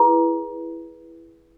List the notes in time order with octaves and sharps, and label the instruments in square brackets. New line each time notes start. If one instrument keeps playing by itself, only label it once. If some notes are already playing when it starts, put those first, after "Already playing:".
Already playing: [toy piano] E4 G#4 B4